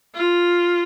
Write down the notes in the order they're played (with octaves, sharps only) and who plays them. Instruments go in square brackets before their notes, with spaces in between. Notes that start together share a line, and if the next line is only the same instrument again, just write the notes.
[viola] F4